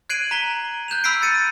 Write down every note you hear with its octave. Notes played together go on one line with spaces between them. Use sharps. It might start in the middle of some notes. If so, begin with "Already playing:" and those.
F#6 G#6 C7 D7 D#7 F#7
A#5 B6 G7
F#6 G6 E7 F7
B5 E6 F#6 B6 C7 D7
A6 C#7 D#7